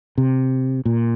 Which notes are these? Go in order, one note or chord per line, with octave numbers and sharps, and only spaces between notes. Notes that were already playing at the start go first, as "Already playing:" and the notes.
C3
A#2